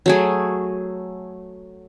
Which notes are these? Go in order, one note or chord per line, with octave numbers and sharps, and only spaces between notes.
F#3 A3 G#4